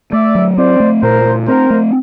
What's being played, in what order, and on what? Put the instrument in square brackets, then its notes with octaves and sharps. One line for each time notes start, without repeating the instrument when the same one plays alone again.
[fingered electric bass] A3 [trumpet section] D5 E5
[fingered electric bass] F#3
[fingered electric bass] C4 [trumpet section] C5 D5
[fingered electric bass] A3
[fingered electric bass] A#2 [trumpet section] A#4 C5
[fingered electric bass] A3
[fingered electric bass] C4 [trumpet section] A#4 C5
[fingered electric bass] A3